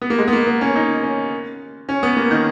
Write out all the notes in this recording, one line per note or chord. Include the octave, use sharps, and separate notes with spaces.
B3
A#3
G#3
B3
A#3
B3
C#4
D#4
C#4
C#4
B3
A#3
D#3